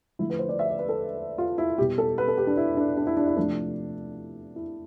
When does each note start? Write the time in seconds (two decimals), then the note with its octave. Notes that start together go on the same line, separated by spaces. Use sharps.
0.19 D3 F3 A3 E4
0.30 B4
0.39 C5
0.49 D5
0.59 E5
0.69 D5
0.79 B4
0.89 A4
1.38 F4
1.58 E4
1.78 B2 G3 G4
1.98 A4
2.18 B4
2.28 A4
2.38 G4
2.47 D4
2.57 E4
2.77 D4
2.97 D4
3.07 E4
3.17 D4
3.27 E4
3.37 C3 F3 A3 D4
4.56 E4